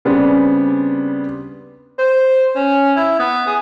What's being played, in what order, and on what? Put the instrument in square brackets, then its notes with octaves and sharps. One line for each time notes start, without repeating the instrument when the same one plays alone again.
[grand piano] C#3 G3 B3 C4 D4
[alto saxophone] C5
C#4
E4
B3
G#4